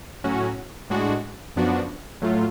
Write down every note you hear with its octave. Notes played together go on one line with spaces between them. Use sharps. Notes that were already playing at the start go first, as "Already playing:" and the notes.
A2 F#3 C#4 F#4
A2 G#3 D4 F#4
F#2 F3 B3 D4 F#4
A2 F#3 A3 F4